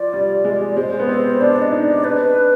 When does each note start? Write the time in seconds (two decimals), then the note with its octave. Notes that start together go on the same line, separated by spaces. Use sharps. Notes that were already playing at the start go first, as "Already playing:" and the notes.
Already playing: F3 D5
0.13 G3
0.44 G#3
0.76 G#3 C5
1.00 B3
1.08 C4 C5
1.41 D4 D5
1.62 D#5
1.72 D#4
1.83 D5
2.04 D4 B4